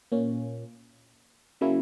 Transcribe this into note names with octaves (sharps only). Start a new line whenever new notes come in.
A#2 A#3 C#4
C#3 F#3 A#3 C#4 E4